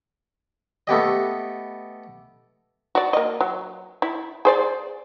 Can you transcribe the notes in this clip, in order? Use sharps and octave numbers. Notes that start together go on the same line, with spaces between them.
A3 B3 G4 D#5
F#4 D5
A#3 D#5
F#3
E4
G#4 C5 D5